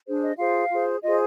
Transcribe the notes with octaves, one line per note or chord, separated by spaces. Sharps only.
D4 G#4 C5
D#5
F4 G#4 C5 F5
F4 G#4 C5
F4 G#4 C5 D#5